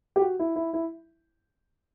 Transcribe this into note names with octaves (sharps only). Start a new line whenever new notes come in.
G4
F#4
E4
E4
E4